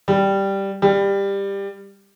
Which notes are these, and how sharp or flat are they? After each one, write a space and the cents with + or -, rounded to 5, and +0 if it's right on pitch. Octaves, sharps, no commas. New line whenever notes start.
G3 +0
G3 +15